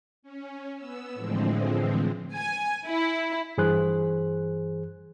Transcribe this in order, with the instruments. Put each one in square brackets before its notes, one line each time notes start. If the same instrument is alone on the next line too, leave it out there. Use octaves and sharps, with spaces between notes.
[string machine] C#4
B3 E6
A2 D3 E3 F3 G#3 C4
[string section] G#5
E4
[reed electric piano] G2 E3 G#4 C5 F#6